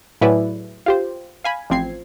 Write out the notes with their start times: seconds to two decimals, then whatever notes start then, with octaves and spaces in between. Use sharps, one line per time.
0.21 A2 F#3 E4 G#4 B4 D5
0.86 F4 G4 C5
1.44 F5 G#5 B5
1.70 A1 F3 C4 G#6 C7